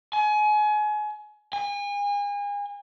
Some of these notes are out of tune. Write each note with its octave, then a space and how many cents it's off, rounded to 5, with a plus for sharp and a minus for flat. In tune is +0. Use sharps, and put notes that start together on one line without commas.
G#5 +30
G#5 -35